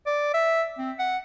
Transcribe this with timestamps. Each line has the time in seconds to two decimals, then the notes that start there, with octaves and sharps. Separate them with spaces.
0.06 D5
0.34 E5
0.78 C4
0.99 F#5